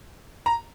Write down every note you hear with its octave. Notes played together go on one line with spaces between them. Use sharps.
A#5